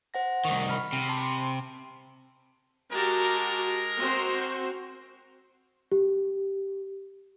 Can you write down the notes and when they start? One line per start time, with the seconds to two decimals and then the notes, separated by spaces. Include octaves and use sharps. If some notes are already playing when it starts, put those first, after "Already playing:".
0.14 C5 F#5 A#6
0.45 C2 D#3 C#6
0.69 B5 F6
0.93 C3
1.09 A5 B5 C6
2.91 G#3 F#4 G4 A#4 A5
3.96 C4 F#4 C5
5.92 G4